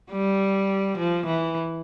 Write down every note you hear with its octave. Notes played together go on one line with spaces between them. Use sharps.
G3
F3
E3